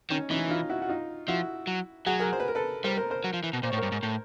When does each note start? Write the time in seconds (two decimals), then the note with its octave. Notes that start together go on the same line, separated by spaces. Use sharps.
0.10 D#3 C#4 D#4
0.30 E3 C#4 D#4
0.49 D#4 F4
0.69 E4 F#4
0.82 F#4
0.88 D#4 F4
1.28 F3 E4 F#4
1.67 F#3
2.06 F#3 F#4 G#4
2.19 G#4 A#4
2.33 C5
2.40 B4
2.48 A#4
2.55 A4 B4
2.84 G3 A#4 C5
2.97 A#4 C5
3.10 A#4 C5
3.24 F#3
3.34 F3
3.43 E3
3.53 B2
3.63 A#2 C5
3.70 C#5
3.73 A2
3.78 G2 A#4 C5
3.92 G#2
4.03 A2